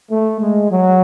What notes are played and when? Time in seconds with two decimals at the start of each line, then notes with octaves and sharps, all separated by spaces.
0.11 A3
0.41 G#3
0.71 F#3